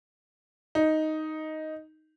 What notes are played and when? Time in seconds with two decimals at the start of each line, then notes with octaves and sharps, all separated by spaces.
0.75 D#4